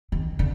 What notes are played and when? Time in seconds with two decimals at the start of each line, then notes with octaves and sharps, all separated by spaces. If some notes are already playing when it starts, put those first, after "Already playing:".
0.12 D#3
0.39 D3